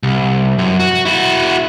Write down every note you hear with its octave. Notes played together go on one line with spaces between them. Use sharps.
C2
F#2
F#4
E4 F#4